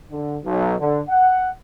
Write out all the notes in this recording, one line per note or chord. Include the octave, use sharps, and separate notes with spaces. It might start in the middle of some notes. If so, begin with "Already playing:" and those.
D3
B1
D3
F#5